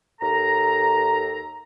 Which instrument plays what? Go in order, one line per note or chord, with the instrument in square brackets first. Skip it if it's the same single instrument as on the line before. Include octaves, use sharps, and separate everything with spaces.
[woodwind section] D#2 A4 A#5